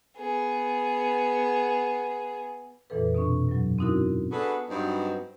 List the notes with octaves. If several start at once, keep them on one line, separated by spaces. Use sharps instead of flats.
B3 G#4
F2 A#2 E3 A4 B4
B2 C4 D4 C#6
G2 F#3
C4 C#4 D#4 E4 F#4 A#4
B3 D4 F#4 G#4 A4 B4
G2 F#3 B3 C4 D#4